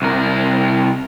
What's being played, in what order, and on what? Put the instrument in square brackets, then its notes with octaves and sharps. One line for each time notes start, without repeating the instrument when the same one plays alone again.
[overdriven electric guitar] C2 A#4